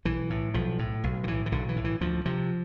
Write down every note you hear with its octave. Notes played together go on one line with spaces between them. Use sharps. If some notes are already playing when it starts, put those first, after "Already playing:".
B1 E3
A2
B1 F3
A2
B1
D3
A2 E3
E3
B1 D3
E3
A2
E3
D2 F3
C3 F3